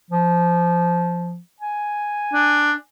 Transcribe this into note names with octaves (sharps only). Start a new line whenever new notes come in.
F3
G#5
D4